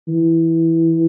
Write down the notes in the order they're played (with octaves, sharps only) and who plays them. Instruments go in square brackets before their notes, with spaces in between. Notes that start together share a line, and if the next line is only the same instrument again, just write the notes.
[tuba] E3